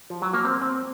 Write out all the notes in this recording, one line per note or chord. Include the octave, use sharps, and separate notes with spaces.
F3
F#3
A#3
C4
C4